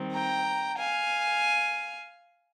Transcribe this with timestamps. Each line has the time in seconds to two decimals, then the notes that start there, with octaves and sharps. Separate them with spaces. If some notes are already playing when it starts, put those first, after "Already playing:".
Already playing: D#3 G3 C4
0.14 G5 A#5
0.79 F5 G#5